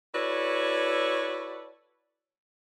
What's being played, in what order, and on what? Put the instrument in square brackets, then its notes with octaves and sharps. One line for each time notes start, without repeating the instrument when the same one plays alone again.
[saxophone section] E4 F#4 A4 B4 C#5 D5